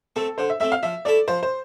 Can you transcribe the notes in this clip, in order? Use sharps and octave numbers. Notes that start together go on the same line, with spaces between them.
A3 C4 A4
D3 C5
E5
A3 C4 E5
F5
F3 E5
A3 E4 A4 D5
F3 C5
C5